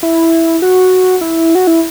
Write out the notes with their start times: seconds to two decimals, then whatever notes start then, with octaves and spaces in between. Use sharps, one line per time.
0.03 E4
0.62 F#4
1.21 E4
1.55 F#4
1.67 E4